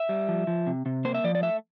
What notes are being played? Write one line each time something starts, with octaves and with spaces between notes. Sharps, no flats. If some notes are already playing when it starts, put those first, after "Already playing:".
Already playing: E5
G3
F3
F3
C3
C3
A#3 C5
E5
F3 D5
D5
A3 E5